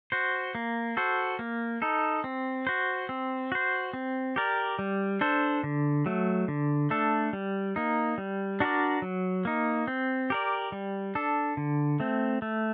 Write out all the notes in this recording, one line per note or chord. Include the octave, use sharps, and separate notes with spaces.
F#4 C5
A#3
F#4 A4 C5
A#3
D#4 A4
C4
F#4 C5
C4
F#4 C5
C4
G4 A#4 D5
G3
D4 A4 C5
D3
F#3 A3
D3
A3 D4 A4
G3
A#3 D#4
G3
D4 F#4 A#4 D5
F#3
A#3 D#4
C4
G4 A#4 D5
G3
D4 A4
D3
A3 C4
A3